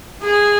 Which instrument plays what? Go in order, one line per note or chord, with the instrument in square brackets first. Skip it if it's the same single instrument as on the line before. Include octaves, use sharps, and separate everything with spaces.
[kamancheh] G#4